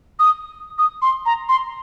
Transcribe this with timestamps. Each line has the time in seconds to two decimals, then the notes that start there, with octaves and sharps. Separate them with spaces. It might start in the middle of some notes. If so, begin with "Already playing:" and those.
0.19 D#6
0.78 D#6
1.02 C6
1.26 A#5
1.49 C6